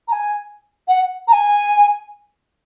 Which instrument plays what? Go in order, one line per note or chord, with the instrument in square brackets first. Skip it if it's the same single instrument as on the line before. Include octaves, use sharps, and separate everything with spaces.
[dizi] A#5
G#5
F#5
A#5
G#5